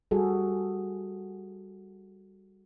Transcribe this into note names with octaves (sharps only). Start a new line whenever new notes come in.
G3 F#4 G#4 A4